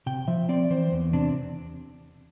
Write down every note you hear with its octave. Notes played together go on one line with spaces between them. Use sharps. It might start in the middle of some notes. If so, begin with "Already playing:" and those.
C3 G5
F3 E5
C4 D5
E3 C5
E2
C3 D4